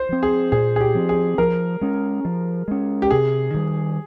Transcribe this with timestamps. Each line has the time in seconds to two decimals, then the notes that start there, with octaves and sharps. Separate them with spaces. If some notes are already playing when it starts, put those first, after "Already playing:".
Already playing: C5
0.09 F3 C4
0.23 G#4
0.52 A#2 G#4
0.76 G#4
0.81 G4
0.95 F3 C4
1.09 G#4
1.38 F3 A#4
1.81 G#3 C#4
2.25 F3
2.68 G#3 C#4
3.02 G4
3.11 C3 G#4
3.54 D#3 G3